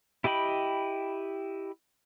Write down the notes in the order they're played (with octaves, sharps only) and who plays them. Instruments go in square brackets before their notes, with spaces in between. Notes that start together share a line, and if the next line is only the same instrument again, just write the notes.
[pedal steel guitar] E4 G4 D#5 G5 B5